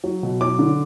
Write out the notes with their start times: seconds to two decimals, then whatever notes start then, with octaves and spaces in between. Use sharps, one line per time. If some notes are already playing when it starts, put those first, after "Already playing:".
0.04 F#3
0.23 B2
0.41 F#3 D6
0.59 D3